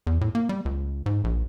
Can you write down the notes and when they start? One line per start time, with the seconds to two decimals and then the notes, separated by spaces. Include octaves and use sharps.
0.07 E2
0.21 A2
0.35 A#3
0.49 G3
0.65 C#2
1.06 G#2
1.24 A#1